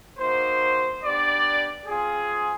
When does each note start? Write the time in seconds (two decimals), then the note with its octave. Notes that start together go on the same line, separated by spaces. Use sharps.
0.18 A#3 D#4 F#4 C5
1.02 B3 D4 G4 D5
1.86 C4 F4 G#4